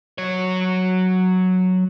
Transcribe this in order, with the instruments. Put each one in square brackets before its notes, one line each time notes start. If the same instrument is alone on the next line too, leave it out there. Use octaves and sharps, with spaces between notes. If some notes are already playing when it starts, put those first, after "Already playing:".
[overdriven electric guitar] F#3 C#5